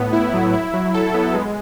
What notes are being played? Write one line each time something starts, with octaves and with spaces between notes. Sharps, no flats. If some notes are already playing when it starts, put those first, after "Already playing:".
Already playing: A2 B3
E4
F#3
E4
F#3
A4
B3
G#3